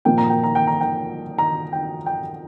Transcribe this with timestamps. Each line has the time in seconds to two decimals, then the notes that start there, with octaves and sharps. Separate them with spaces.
0.05 A#2 F3 A#3 G5
0.18 A#5
0.30 G5
0.44 A#5
0.55 G5
0.67 A#5
0.81 G5
1.38 A#5
1.72 G5
2.06 G5